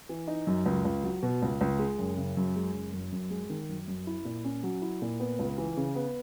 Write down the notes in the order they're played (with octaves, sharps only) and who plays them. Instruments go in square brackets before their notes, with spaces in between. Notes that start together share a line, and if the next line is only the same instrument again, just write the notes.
[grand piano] E3
D#4
F#2
C#2
C#2
F#3
B2
C#2
C#2
G#3
F#1
C#3
F#2
G#3
F#1
F#2
F#2
G#3
D#3
F#2
F#2
E4
A#2
C#4
F#3
E4
A#2
B3
C#2
E3
C#3
B3